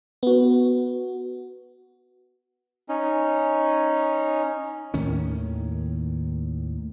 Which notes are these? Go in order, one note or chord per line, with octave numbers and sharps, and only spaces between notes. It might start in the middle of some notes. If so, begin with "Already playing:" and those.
B3 F#4
C#4 D#4
D#2 A2 D#3 C#4